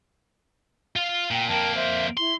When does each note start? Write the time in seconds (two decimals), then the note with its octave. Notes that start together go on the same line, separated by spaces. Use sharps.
0.96 F4 F5
1.31 A#2 G5
1.48 F2 A#3 A#4 G5 A5
1.73 C5 E5
2.17 E4 C6